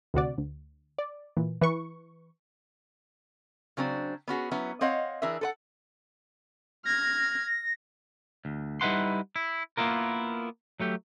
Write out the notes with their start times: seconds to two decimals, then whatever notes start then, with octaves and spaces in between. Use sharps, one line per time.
0.14 D2 C3 F#4 D5
0.38 D2
0.98 D5
1.37 A#2 E3
1.61 E3 B4 C#6
3.77 C#3 F#3 C4 D4
4.28 B3 C#4 F#4 G#4
4.51 F#3 B3 C#4 E4
4.81 C4 C#5 D#5 F5 F#5
5.22 E3 D4 G#4 A#4 E5
5.41 A4 B4 F#5
6.85 F6 G#6 A#6
8.45 D2
8.81 G3 D#4 E4 B4 F#5 C6
9.36 E4
9.77 A#3 B3 E4 F4 A#4
10.80 F#3 A3 G4